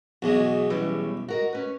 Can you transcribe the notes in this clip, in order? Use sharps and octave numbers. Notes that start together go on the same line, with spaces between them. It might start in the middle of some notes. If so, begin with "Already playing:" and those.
B1 E2 G#3 F#4 G#4 D#5
E3 G3 C#4
F#4 A#4 D#5
C#4 B4